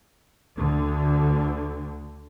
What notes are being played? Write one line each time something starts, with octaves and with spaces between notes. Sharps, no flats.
D2 D3